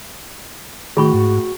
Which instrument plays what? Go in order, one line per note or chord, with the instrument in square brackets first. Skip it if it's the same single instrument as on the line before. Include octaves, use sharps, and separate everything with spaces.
[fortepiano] A2 [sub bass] D#3 [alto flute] F#4 [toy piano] G#4 B5 C#6
[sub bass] G#2